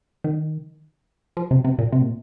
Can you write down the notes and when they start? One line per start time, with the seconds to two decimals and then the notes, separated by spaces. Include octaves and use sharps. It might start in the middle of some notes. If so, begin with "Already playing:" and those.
0.24 D#3
1.37 F3
1.51 C3
1.64 C3
1.79 A#2
1.92 C3
2.02 A#2